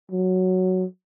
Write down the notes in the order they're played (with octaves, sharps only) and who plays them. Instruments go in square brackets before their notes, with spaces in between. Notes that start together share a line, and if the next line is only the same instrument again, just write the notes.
[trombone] F#3